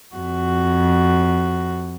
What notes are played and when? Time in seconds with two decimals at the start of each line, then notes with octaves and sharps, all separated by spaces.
0.16 F2 F#4